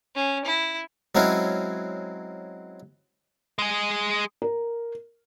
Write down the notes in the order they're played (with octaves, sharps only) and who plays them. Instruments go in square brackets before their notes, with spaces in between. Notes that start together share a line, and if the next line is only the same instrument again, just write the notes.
[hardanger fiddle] C#4
E4
[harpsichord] F#3 G#3 C4 C#4 E4
[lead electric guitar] G#3 G#4
[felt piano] A#4